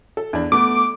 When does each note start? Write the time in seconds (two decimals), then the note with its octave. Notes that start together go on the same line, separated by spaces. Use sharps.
0.17 A4
0.33 E2 D4
0.52 A3 B3 D6